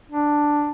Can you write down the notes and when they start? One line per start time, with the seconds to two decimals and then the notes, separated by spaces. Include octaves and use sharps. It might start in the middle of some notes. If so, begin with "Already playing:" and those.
0.11 D4